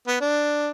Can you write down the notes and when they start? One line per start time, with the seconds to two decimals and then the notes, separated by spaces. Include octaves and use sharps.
0.07 B3
0.21 D4